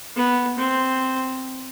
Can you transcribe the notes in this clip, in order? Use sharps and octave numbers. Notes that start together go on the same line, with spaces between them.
B3
C4